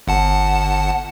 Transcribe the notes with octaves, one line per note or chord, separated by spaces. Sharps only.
G1 F#5 A5